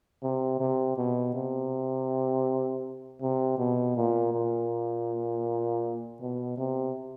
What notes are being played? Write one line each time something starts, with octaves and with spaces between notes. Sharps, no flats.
C3
C3
B2
C3
C3
B2
A#2
A#2
B2
C3